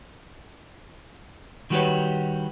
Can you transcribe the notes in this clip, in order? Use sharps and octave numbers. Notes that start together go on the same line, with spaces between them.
D#3 G3 F#4 G4 B4 C#5